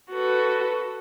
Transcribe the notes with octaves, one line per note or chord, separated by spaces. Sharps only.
F#4 A4 B4